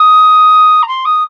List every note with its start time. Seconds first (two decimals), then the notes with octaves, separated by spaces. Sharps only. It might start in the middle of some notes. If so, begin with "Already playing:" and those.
Already playing: D#6
0.82 A#5
0.88 C6
1.05 D#6